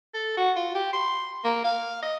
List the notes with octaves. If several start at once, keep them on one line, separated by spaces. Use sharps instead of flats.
A4
F#4
F4
G4
C6
A#3
F5
D#5